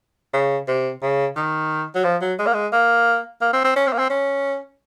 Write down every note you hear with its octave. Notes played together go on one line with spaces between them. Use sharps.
C#3
C3
C#3
D#3
F#3
F3
F#3
G#3
A#3
G#3
A#3
A#3
C4
C4
C#4
C4
A#3
C4
C#4